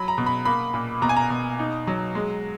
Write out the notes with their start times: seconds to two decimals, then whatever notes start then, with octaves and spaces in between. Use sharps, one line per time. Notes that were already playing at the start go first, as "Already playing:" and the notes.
Already playing: F#3 B5
0.08 A#5
0.18 B2
0.26 B5
0.45 A#3 B5
0.74 A#2
1.02 B2 A#5
1.09 G#5
1.16 A#5
1.30 B2
1.59 D#4
1.87 F#3
2.15 G#3